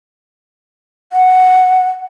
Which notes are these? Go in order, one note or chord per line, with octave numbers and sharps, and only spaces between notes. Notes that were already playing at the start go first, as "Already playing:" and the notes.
F#5